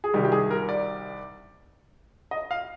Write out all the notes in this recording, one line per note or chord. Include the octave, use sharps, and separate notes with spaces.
G#4
C2 C3 D#3 G3 G4
G4
G#4
A#4
D5
D#5
F5